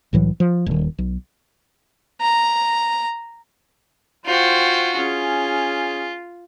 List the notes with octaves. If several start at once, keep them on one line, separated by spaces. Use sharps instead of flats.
C2 A2 E3 F#3
F3
D#1 D#3
B1
A#5
F4 F#4 C5 G5
C#4 F4 G#4